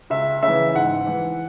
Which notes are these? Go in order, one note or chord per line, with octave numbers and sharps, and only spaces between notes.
C#2 E5
C#3 E5
E3
G#2 F#5
E3